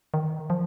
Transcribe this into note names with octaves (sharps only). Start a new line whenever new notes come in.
D#3
F3